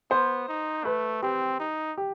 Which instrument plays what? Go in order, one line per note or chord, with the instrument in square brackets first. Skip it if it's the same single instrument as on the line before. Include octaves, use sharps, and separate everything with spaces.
[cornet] B3 [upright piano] C5
[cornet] D#4
[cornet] A3 [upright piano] B4
[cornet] C4 [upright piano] G4
[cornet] D#4
[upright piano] G4